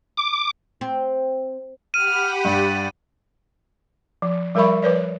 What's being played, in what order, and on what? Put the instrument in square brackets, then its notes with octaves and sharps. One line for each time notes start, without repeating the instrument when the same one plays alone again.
[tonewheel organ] D6
[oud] C4
[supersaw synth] G4 F#5 B5 [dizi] F6 [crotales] D#7
[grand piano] G2 [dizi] D5
[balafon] F3
F3 G3 A#4 E5 B5 C#6
F3 B4 C#5 D5